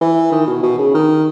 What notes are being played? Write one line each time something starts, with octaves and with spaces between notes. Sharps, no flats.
E3
D#3
B2
B2
C#3
D#3